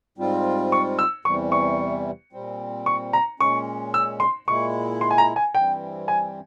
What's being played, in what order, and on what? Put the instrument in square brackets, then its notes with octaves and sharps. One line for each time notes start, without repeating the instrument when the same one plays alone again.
[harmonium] G#2 G3 C4 F4
[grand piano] C#6
E6
[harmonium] E2 C3 E3 G3 [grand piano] C#6
[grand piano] C#6
[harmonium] A#2 G3 C4
[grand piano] C#6
A#5
[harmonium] A#2 G#3 C#4 [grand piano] C#6
[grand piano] E6
C6
[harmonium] A#2 G#3 E4 [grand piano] C#6
[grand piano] C6
G#5
A#5
G#5
[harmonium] G2 E3 G3 C4 [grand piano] G5
[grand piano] G#5